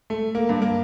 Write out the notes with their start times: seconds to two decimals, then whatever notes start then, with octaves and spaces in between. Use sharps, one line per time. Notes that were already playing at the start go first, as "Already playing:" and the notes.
0.10 A3
0.35 A#3
0.49 G2
0.62 A#3